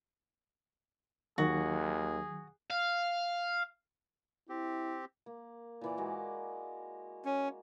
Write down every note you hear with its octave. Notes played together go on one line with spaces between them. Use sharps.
D#2 D#3 F#3 F#4 G#4
F5
C4 E4 G4
A#3
A#2 E3 D5
G#3 A#3 F#4
C#4